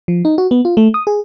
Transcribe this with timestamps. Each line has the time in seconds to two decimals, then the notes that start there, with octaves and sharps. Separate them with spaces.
0.08 F3
0.25 D#4
0.38 F#4
0.51 B3
0.65 F4
0.77 A3
0.94 D#6
1.07 G#4